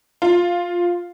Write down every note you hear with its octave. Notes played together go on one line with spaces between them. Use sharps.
F4